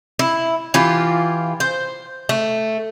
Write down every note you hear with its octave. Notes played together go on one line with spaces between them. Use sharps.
E4
E3 F4 G4
C5
A3